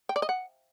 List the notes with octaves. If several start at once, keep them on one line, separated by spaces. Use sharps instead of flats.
G5
D5
D#5
F#5